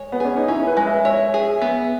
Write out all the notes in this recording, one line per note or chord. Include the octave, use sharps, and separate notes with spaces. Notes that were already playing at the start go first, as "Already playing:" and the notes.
Already playing: G#3 C#5
B3
C#4 G#4
D#4
C#4 E4
B4
G#3
E5
C#5 E5
G#4
B3